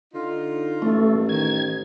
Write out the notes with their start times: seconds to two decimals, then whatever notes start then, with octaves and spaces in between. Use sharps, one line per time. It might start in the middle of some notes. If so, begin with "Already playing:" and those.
0.14 D3 D#4 F4
0.82 A1 A3
1.29 D#3 G#6